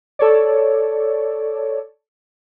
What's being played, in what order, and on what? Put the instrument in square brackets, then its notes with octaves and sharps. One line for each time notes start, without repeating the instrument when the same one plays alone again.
[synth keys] A4 C#5 D5